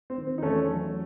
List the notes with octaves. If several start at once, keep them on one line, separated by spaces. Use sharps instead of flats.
C4
D#3
C4
D#4
E2 A3 C#4
F#3